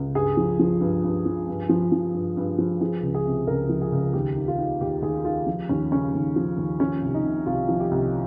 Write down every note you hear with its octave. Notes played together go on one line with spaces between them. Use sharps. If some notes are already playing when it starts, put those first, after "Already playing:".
Already playing: C#2
G2 G#4
F3
F3
G2
G2
F3
G2
F3
F3
G2
G2
F3
F3 G#4
C#2
G#4
C3
C#2 A#4
F3
G#4
C#2
D#2 G4
D#3
F4
D#3
D#2 G4
D#2 G#4
D#3 F4
F3
D#2 C#4
C#3 C#4
D#2
F3
D#2
F3 C#4
C2
D#4
C3
C2 F4
F3
G4
C2